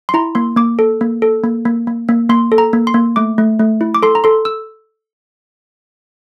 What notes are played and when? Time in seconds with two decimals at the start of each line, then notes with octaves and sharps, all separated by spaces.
0.09 C6
0.14 E4 A#5
0.35 A#3 C6
0.56 A#3 D6
0.79 A4
1.01 A#3
1.22 A4
1.44 A#3
1.65 A#3
1.87 A#3
2.09 A#3
2.29 A#3 C6
2.52 A4
2.58 A#5
2.73 A#3
2.87 C6
2.94 A#3
3.16 A3 D6
3.38 A3
3.59 A3
3.81 E4
3.95 D6
4.03 A4 C6
4.15 A#5
4.24 A4 C6
4.45 E6